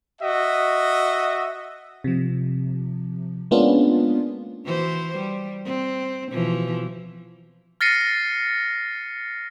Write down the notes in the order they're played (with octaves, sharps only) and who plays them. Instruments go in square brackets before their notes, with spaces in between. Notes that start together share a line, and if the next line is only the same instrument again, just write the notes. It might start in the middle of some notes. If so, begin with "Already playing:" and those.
[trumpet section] F#4 D#5 E5
[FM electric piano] C3 F3
G#3 A#3 B3 C#4 D4 F4
[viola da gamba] E3 F#4 C5
G3
C4
B2 E3 F3
[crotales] F6 A6 A#6 C7 C#7 D#7